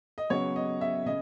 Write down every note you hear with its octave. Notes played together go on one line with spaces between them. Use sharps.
D#5
C#3 F#3 B3 C#5
D#5
E5
C#3 D#5